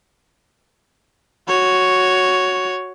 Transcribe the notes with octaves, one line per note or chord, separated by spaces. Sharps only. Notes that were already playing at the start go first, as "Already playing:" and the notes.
F#4 C#5